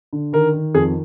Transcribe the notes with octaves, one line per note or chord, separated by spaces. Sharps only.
D3
D#3 A#4
D#3
F2 G#4